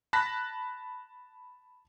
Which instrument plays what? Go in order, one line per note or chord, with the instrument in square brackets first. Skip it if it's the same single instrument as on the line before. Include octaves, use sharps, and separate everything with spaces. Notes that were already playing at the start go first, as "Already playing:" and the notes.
[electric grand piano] A5 B5 F#6 A#6 B6